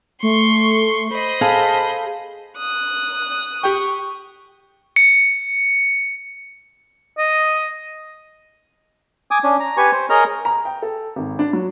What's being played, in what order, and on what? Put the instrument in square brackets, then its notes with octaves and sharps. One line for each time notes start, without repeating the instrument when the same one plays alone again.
[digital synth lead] A3 [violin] C6 C#6
[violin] C5 D#5 [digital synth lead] B5
[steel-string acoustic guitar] G#4 A4 F5
[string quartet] D#6 F#6
[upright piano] G4 G5 [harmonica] C#6
[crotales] C#7
[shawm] D#5
[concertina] G#5 D6 D#6
C#4 D4
A#5
G4 B4 G#5 C#6
C5
G#4 A#4 C#5 D#5 A#5 F6
[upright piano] A#5
G5
A4
G#1
D4
F#3